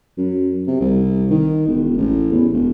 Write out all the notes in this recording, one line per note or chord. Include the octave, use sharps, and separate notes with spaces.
F#2
C3
C2
D#3
E1
A1
E2
E1